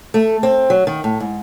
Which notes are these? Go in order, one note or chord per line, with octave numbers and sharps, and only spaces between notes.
A3
C4
F#3
D#3
A2
G#2